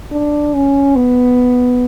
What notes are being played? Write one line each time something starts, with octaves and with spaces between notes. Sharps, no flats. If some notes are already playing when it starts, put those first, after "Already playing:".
D4
C#4
B3